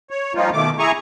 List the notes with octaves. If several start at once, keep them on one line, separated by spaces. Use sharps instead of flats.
C#5
F3 G3 A#3 D#4 F4
B2 D#3 A3 D6
E4 G#4 G#5 A#5 C#6